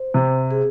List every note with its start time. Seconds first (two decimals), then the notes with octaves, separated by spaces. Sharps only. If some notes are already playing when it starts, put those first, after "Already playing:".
Already playing: C5
0.14 C3
0.51 G#4